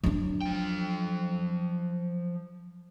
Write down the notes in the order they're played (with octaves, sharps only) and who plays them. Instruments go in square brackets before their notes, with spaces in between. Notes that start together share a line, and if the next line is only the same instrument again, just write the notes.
[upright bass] F#3 D4
[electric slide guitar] F3 G5